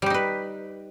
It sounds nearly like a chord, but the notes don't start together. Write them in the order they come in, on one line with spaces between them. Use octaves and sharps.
G3 G4 D#4 B4